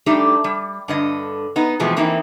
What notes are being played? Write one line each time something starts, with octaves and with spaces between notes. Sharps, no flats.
G3 A3 D4 D#4 G4
G3
G2 D3 D#5
B3 D#4
B2 E3 F3 G#3 A3 C4
E3 A#3 C4 D#4 E4